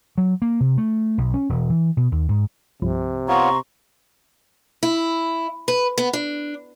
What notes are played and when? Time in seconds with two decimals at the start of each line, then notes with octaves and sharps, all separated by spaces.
0.18 F#3
0.42 A#3
0.60 C3
0.78 A3
1.18 B1
1.34 C#4
1.49 E1
1.70 E3
1.97 B2
2.12 D#2
2.29 G#2
2.82 C2 G2 C3 F3
3.28 B3 F4 C#5 A#5 C6 C#6
4.83 E4
5.68 B4
5.98 B3
6.13 D4